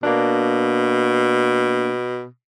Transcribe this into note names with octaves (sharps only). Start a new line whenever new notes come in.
B2 A#3 D4